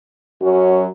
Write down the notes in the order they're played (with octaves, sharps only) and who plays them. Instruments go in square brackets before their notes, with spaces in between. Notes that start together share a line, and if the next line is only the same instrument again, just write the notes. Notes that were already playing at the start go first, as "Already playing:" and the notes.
[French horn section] F#2 F#3 C#4 F#4